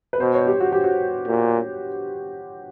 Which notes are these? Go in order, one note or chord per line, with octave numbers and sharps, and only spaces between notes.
B4
B2 C5
C#5
G4
F#4
G4
F#4
A#2